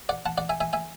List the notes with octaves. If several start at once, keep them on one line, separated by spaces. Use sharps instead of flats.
D5 F#5
F#5 A5
D5 F#5
E5 G#5
E5 G#5
E5 G#5